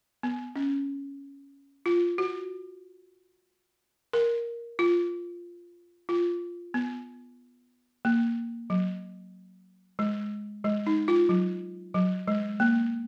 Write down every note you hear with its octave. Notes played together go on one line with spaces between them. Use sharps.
B3
C#4
F4
F#4
A#4
F4
F4
B3
A#3
F#3
G#3
G#3
D#4
F4
F#3
F#3
G#3
A#3